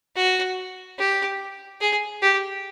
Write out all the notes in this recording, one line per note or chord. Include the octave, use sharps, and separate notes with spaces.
F#4
G4
G#4
G4